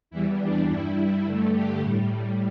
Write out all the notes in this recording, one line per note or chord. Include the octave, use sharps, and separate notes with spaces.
E2 E3 G3 E4
D4
G2 G3 E4
G2 D3 A3
G4
A2 G3